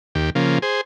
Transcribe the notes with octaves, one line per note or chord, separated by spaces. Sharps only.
D#2 G4
C#3 F3 A#3
G#4 C5